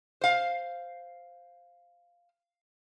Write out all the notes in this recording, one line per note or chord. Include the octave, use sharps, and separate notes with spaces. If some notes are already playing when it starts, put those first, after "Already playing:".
C5 F5